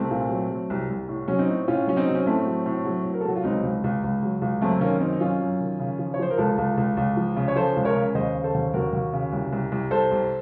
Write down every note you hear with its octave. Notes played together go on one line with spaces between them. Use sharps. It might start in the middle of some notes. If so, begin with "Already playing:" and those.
Already playing: C2 A3 C4
A#2
F#3
F#3
C2
C2
A2
F#3 C#4
C4 D#4
A2
A2 C#4 F4
F#3 C#4
C4 D#4
F#3
C#4
A2 A3 C4
F#3
A2
F#3
A2
A#4
A4
F#3 F#4
F4
C#2 C4 D#4
C#2
C#2
C#2
F#3
C#2
F#2 A3 C4
D#3 A#3 C#4
F#2 C4 D#4
D#4
F#2 C#4 F4
F#2
D#3
C#3
F3
C#5
F3 C5
A#4
C#2 F4 A4
C#2
C#2
C#2
F3
C#3
C#5
F3 A4 C5
C#2
A#4 C#5
C#3
D#2 C5 D#5
C#3
A4 C5
D#2
D#2 F#4 A#4
D#2
C#3
C2
C2
C2
C2 A4 C5
C2